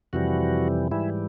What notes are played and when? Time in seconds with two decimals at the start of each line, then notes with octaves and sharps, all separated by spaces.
0.13 F2 C3 E3 G3 F#4
0.91 G#2 E3 G3 E4